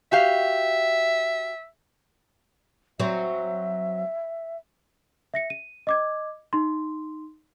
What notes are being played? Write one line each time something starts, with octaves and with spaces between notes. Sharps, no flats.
F#4 G4 E5 F5
F#3 C4 E5
E5 A#6 C#7
D#7
D#5 D6 G#6
D#4 C6